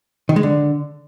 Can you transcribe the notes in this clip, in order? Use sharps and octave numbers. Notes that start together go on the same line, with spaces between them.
D#3
G#3
D3